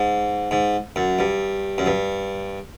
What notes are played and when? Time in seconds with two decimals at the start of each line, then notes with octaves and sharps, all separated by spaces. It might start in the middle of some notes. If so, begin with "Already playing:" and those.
Already playing: G#2
0.51 G#2
0.96 F#2
1.19 G2
1.78 F#2
1.86 G2